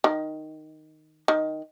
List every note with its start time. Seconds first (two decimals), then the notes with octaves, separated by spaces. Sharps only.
0.04 D#3
1.28 D#3